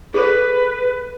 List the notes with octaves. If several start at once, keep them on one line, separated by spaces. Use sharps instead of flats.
G#4 A4 B4 C5